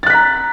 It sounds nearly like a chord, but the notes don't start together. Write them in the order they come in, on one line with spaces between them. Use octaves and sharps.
A6 F#6 B6 A#5